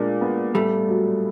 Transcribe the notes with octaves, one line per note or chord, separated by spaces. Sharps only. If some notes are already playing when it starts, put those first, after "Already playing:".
Already playing: A#2 G#3 A#3 D4
B3
A2 G3 A3
F#3